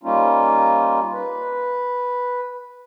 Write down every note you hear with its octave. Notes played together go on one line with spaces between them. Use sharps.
G3 A#3 C#4 D#4 F4
B4